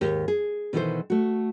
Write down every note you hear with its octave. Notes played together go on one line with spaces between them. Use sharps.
D#2 G#2 G4
G#4
B2 D#3 E3 E4 A4 C5
A3 F#4